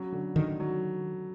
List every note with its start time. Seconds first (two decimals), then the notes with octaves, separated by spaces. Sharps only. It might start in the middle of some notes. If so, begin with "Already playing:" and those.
Already playing: C#3 F#3
0.12 D3
0.36 D3 D#3
0.60 F#3